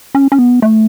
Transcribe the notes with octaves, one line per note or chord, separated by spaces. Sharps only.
C#4
C#4
B3
A3